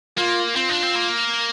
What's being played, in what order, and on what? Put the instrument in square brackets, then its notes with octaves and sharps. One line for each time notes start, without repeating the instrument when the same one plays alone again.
[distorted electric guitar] A#3 [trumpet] F4
[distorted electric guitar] C4 [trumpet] F4
[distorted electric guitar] D4
C4
A#3